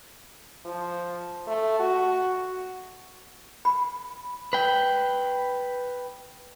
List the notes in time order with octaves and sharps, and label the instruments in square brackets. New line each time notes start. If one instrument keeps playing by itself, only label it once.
[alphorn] F3
A3
F#4
[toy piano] B5
[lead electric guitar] B4 G5